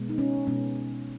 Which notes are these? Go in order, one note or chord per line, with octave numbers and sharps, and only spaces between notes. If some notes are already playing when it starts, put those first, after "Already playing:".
Already playing: B2 G#3 B3
D#4
C#4
B2 G#3 B3 C#4